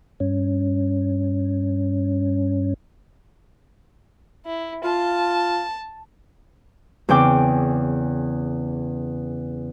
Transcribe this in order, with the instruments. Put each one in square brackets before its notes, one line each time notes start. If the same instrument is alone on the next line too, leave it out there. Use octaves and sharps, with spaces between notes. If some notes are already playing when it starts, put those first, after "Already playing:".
[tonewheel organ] G2 C#4
[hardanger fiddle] E4
[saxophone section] F4 [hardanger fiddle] A5
[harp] E2 C#3 C4 G5 D6